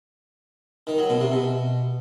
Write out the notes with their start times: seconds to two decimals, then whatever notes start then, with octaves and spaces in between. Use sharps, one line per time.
0.87 D#3
0.98 F#3
1.09 B2
1.20 C3
1.32 B2